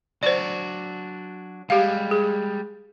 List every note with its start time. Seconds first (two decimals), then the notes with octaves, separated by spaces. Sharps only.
0.23 F#3 D4 F#4 C5 D5
1.70 G3 G#3 G4 F5
2.11 G#4